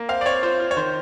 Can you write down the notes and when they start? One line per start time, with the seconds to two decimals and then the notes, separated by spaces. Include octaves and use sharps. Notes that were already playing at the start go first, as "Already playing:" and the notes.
Already playing: A#3
0.09 C4 F5
0.21 D5
0.26 C4 C#5
0.43 F4 C5
0.60 F4
0.71 C#5
0.77 D#3 C5